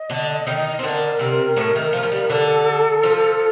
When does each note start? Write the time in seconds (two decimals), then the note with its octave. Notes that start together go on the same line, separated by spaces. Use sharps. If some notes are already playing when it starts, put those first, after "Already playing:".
Already playing: D#5
0.10 D3 D4
0.47 D#3 D#4
0.79 C4
0.83 D3 D4 A#4
1.19 C3 C4
1.56 A2 A3
1.76 D#3
1.93 F3
2.03 F3
2.12 G3
2.29 D3 D4 A4
3.03 F3 F4